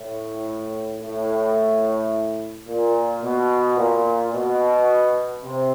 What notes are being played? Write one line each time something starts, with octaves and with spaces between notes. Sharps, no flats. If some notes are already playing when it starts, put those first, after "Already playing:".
Already playing: A2
A2
A#2
B2
A#2
B2
C3